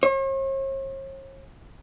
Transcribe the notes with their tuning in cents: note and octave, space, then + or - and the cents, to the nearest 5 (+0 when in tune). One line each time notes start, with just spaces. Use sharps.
C#5 -45